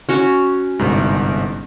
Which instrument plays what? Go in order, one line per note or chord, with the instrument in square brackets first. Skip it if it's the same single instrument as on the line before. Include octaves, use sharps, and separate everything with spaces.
[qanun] C#4 F#4
[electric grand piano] G1 C2 G#2